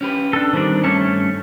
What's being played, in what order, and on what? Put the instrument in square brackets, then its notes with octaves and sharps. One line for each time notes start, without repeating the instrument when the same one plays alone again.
[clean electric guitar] C#4 G4 B4
[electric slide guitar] D4 A4
[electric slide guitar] D#3 G3 D4 [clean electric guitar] C4
[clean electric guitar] G2 A5 [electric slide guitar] A3 C#4 C#5